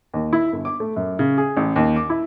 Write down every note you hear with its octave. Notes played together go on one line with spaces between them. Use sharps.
D#2
E4
G1
D6
A3
F#2
C#3
G#4
A1
D#2
D6
E4